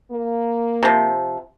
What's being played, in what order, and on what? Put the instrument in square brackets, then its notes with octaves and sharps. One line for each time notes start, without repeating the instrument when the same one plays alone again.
[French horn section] A#3
[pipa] C3 F3